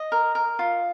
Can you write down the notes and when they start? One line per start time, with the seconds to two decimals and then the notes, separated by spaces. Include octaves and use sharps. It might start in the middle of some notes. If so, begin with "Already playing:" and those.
Already playing: D#5
0.12 A#4
0.35 A#4
0.59 F4